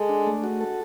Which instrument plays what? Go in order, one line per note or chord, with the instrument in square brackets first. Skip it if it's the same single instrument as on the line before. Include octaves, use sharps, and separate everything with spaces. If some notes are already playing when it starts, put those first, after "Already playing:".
Already playing: [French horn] G#3 [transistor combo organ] A4
[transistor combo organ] D4
A3
F#4
A4